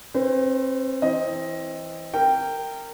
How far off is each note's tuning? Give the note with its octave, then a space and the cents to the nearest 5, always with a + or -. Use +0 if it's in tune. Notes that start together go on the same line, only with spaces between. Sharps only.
C4 +35 C5 -45
E3 -5 C4 +20 D#5 +15
A#4 -20 G5 +0